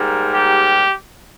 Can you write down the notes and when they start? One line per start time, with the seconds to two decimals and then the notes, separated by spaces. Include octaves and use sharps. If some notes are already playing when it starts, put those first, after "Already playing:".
Already playing: G#2 G3 A#3
0.34 G4